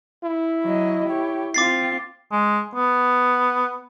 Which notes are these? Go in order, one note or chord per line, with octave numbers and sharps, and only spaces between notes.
E4
F#3 D#5
G4 C#5
C4 F4 D6 A6 C7
G#3
B3